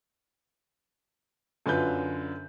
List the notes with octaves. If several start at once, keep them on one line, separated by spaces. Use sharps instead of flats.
F#2 D3 F4 B4 G6